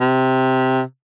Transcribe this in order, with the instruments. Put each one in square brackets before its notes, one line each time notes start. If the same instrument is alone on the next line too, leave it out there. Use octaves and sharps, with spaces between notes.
[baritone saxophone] C3